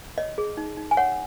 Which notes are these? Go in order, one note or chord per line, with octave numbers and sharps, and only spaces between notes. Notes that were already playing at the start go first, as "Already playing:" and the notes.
C#5 D#5
G#4
D#4
D#4
G#5
C#5 F#5